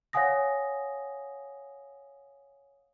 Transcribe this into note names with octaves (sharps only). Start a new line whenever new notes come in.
C#5 F5 F#5 G#5 D#6 A#6